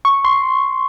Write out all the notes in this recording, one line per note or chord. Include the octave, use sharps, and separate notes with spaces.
C#6
C6